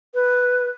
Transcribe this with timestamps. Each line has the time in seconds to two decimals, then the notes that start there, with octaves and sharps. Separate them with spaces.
0.14 B4